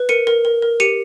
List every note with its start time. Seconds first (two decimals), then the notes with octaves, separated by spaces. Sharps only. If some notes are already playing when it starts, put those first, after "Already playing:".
Already playing: B4
0.09 A#4 C#7 D#7
0.27 A#4
0.45 A#4
0.62 A#4
0.80 G4 C#7 D#7